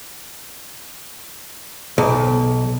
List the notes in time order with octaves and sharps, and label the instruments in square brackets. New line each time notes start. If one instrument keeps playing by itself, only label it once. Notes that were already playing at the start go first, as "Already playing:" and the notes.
[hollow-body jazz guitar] B1